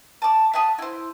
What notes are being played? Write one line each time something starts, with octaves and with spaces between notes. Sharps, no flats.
A5 D6
E5 F#5 A5 D#6
E4 C5